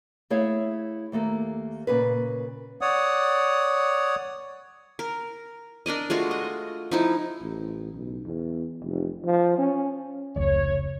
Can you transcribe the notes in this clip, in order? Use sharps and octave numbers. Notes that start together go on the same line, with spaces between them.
A3 E4 G#4 C#5 F5
D#2 A3 A#3 A4
A#2 C#3 B4
C#5 D5 F#5 D#6
A#4
D4 A#4 D5 D#5
G#3 A3 F4 F#4
D#5
F3 D#4 E4
A1
B1
E2
F1
F3
C#4
F1 C#2 C#5